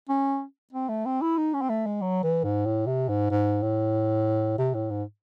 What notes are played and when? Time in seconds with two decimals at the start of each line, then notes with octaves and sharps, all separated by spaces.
0.09 C#4
0.73 C4
0.89 A3
1.05 C4
1.21 E4
1.37 D#4
1.54 C#4
1.61 C4
1.69 A3
1.86 G#3
2.02 F#3
2.23 E3
2.44 G#2
2.66 A2
2.87 C3
3.09 G#2
3.30 G#2
3.62 A2
4.58 C3
4.74 A2
4.91 G#2